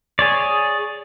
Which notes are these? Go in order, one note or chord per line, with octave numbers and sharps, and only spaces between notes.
G#4 C#5 D5